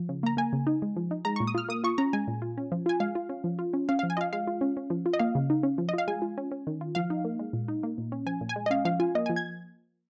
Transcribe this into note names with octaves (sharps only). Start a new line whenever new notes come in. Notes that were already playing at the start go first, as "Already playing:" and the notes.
Already playing: F3
C#3
A#3 A#5
A#3 G#5
C#3
D#4
G#3
F3
D#4
G#3 A#5
A#2 C#6
D#6
F4 F6
A#3 D#6
F4 C#6
C#4 A#5
G#3 G#5
A#2
F4
C#4
F3
F4 G#5
G#3 F5
F4
C#4
F3
F4
C#4
C#4 F5
F3 F5
G#5
F4 D#5 F5
G#3 F5
F4
C#4
C#4
F3
F4
D#5
A#3 F5
C#3
D#4
C#4
F3
D#5
F4 F5
G#3 G#5
F4
C#4
C#4
D#3
F4
F3 F5
D#4
A#3
G#3
A#2
D#4
A#3
A#2
C#4
F3 G#5
A#2
G#5
G#3
D#5
C#4 F5
F3 F5
F4 G#5
A#3 D#5
F3 G#5
G#6